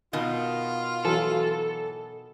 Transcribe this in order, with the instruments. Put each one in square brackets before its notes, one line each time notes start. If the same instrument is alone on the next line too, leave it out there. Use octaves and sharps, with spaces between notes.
[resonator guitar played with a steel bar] B2 D#3 [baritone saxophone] F4
[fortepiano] E3 F#3 [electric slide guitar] A4